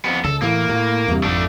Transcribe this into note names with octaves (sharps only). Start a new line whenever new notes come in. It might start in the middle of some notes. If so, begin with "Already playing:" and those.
F2 B3
C#2 A4
A2 E3 A#3
A2
E2 G2 C3
G#1 F2 A3 D4